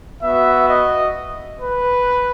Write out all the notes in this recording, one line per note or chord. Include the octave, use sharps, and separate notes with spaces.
B3 F#4 E5
D#5
B4